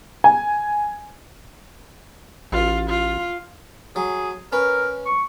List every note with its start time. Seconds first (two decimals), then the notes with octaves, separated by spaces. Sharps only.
0.24 G#5
2.52 A1 F4
2.89 F4
3.96 F#3 G#4
4.52 C#4 A#4 B4
5.06 C#6